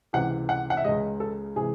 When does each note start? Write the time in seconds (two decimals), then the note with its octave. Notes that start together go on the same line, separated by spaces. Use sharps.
0.13 C#2 C3 E3 F#5
0.49 F#5
0.70 F#5
0.77 E5
0.84 C#2 C#3 G#3 D#5
1.20 A4
1.56 C3 E3 G#3 G#4